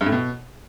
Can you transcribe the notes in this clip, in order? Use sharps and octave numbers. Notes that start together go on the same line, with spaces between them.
G2
A2
B2